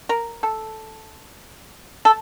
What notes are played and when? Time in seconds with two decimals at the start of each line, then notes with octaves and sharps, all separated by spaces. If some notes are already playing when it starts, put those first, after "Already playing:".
0.09 A#4
0.43 A4
2.05 A4